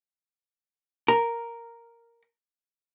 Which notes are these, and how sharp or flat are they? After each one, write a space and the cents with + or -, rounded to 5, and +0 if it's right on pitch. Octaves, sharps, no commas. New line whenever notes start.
A#4 +0 A#5 +0